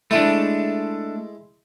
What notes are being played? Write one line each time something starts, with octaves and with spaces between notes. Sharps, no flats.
G#3 A3 D4 E4